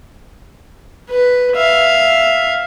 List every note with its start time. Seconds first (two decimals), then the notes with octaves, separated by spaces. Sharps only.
1.10 B4
1.56 E5 F5